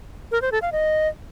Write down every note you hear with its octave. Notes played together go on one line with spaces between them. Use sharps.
A#4
C5
A4
F5
D#5